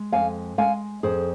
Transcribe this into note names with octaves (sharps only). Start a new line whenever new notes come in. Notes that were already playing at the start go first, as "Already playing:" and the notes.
Already playing: G#3
F2 F5 G#5
G#3 F5 G#5
F2 G#4 C5